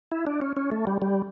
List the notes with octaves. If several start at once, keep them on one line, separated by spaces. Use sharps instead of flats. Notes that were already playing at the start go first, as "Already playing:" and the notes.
E4
D4
C#4
C#4
A3
G3
G3